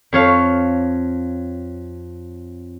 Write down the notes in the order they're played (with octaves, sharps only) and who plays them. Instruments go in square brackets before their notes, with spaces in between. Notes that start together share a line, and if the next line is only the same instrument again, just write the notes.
[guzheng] F2 C#5 F5